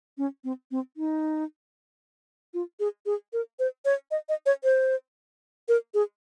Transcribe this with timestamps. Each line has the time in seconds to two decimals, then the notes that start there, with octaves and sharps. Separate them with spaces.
0.18 C#4
0.44 C4
0.71 C4
0.97 D#4
2.54 F4
2.80 G#4
3.06 G#4
3.33 A#4
3.59 C5
3.85 C#5
4.11 D#5
4.29 D#5
4.46 C#5
4.64 C5
5.68 A#4
5.94 G#4